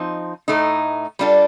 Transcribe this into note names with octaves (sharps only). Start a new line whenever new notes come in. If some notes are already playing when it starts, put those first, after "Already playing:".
Already playing: F3 C4 D#4
A2 A3 D#4
G3 D4 F4 A4